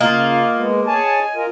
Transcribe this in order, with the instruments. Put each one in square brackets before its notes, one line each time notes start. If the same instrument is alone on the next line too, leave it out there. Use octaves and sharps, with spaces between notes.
[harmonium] C#3 [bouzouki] A#3 [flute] F4 [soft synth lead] D#5
[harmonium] G#3 B3
[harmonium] G#4 C#5 A5 [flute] G#5
[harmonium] F4 A#4